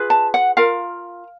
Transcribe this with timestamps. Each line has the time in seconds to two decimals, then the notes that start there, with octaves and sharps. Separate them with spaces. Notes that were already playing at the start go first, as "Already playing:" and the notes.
Already playing: F4 G#4 B4
0.10 A5
0.34 F#5
0.57 F4 A#4 F5